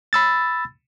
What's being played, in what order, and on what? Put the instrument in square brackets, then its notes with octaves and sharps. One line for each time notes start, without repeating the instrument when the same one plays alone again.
[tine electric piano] B5 E6 A6